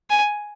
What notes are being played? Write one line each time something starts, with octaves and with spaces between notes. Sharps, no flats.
G#5